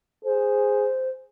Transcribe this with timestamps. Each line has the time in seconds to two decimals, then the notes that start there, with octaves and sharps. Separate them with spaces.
0.25 G#4 C5